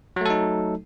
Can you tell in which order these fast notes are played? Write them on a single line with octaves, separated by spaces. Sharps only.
F#3 A3 A4 D#4